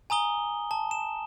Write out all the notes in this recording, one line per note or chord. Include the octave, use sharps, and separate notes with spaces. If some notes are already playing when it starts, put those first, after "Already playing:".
G#5 A#5 D#6 G7
A5
E7